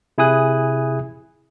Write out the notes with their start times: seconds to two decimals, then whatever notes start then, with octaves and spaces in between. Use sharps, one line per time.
0.18 C3 E4 G#4 G#5 D#6 F#6